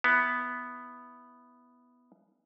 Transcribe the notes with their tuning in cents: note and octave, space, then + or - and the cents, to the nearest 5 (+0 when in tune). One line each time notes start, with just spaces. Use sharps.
B3 +0 E4 +0